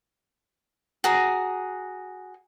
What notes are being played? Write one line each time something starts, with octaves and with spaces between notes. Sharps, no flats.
F#4 G#4 A#5